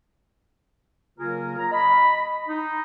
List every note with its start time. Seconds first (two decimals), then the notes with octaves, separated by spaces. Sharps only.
1.18 C#3 F#3 A#3 F4 G#4 A#4
1.58 A#5
1.72 D#5 B5
2.48 D#4